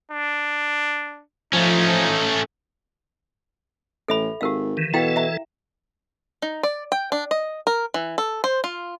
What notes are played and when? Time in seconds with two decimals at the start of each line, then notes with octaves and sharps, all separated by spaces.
0.11 D4
1.53 F3 A3 C#4 D#4
4.08 A1 A4 E5 B5
4.41 G#1 G4 A#4 F5
4.77 D#3 E3
4.94 B2 E3 E4 A4 F5 G5
5.16 E5 A#5
6.42 D#4
6.63 D5
6.92 G5
7.12 D4
7.31 D#5
7.67 A#4
7.94 E3
8.18 A4
8.44 C5
8.64 F4